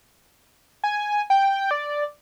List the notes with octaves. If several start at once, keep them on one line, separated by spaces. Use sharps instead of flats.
G#5
G5
D5